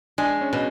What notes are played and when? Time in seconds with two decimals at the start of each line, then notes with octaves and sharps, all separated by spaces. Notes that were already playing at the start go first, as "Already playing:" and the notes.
0.18 G#3 D4
0.41 C#4
0.53 B2